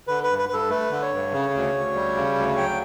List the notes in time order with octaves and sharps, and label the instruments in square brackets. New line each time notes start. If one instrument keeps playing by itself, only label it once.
[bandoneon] D3 [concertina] B4
[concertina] B4
[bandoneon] G2
[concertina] B4
[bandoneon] G2 [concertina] A4 B4
[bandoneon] A3 [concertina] B4
[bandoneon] D3
[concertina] C#5
[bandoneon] G2
C#3
D2
D2
G3
C#3
D2
[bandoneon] F#3 [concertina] G5